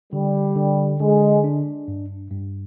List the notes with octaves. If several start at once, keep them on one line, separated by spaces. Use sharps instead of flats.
D3 G3
D3
D3 G#3
D4
G2
G2